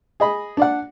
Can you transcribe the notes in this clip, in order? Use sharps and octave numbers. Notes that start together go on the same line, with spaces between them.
G#4 D#5 B5
D4 D5 F#5